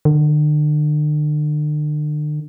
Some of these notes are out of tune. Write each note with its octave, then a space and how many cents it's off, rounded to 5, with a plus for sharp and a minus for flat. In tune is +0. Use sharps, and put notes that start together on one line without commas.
D3 +40